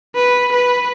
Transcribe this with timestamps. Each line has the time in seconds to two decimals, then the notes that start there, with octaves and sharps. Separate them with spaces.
0.15 B4
0.52 B4